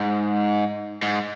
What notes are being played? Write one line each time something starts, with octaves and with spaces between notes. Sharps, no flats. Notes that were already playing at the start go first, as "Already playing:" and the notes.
Already playing: G#2
G#2